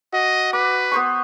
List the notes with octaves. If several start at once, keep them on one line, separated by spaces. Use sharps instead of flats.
F#4 D#5
B4 D6
B3 C5 C#6